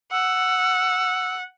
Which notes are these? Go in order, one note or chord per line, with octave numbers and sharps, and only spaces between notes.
F#5 E6